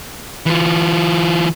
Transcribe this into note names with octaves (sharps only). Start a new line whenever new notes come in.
E3 F4